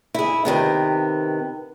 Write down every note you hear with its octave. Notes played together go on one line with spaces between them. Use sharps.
E4 G#4
C3 D#3 B3